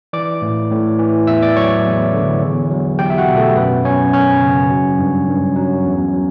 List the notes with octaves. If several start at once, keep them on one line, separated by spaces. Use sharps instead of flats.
E3 D5 D6
A2
A2
E3
E2 E5 E6
D5 D6
F#3 C#5 C#6
E2
D3
E2
F#3
E2 G4 G5
E5
F#4 F#5
B2
A3 A4
F#2 B3 B4
F#3 C#4 C#5
F#2 C#4 C#5
C#3
F#3
G2
G2
F#3
E2
F#3